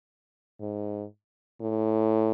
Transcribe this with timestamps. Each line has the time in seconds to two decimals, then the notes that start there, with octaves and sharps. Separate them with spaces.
0.60 G#2
1.61 A2